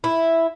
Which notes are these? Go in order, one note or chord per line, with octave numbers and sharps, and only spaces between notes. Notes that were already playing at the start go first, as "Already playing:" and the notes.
E4